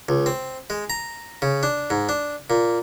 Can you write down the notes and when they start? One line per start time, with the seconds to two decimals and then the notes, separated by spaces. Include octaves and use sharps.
0.09 C#2
0.26 C4
0.70 G#3
0.90 A#5
1.42 C#3
1.63 D4
1.90 G#2
2.09 D4
2.50 A#2